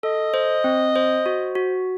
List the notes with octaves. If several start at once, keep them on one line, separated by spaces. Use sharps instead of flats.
A4 D#5
C5
C4
C5
F#4
F#4